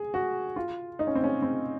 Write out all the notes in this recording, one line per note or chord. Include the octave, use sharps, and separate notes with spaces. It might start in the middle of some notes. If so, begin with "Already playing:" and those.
Already playing: G#4
F#4
F4
D#4
C#4
C4
C#4
C4